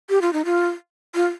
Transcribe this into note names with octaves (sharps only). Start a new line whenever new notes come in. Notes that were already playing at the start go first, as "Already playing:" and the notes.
G4
F4
D#4
F4
F4